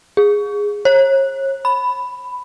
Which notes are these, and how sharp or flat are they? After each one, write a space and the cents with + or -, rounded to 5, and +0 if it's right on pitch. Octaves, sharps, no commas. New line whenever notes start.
G#4 -10
C#5 -40
B5 +10